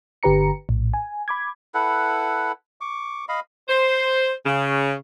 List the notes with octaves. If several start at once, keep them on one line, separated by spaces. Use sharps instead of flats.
G1 D3 G4 B4 A#5 C#7
A#1 A2
G#5
B5 D6 G#6
E4 A4 B4 F#5
C#6 D6
D#5 F5 B5
C5
C#3